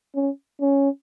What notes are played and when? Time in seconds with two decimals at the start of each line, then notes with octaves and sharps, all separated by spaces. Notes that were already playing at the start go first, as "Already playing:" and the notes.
0.15 C#4
0.61 C#4